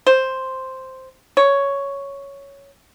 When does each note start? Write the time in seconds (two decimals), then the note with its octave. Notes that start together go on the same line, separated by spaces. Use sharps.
0.07 C5
1.37 C#5